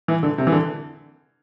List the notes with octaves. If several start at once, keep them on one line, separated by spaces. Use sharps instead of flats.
E3
D3
C3
E3
D3